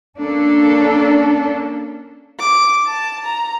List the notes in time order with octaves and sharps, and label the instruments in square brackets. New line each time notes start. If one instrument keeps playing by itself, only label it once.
[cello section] A#3 C#4 D4 A4
[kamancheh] D6
A5
A#5